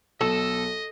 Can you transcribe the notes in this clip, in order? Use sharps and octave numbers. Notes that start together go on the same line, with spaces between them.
B1 B2 A4 D#5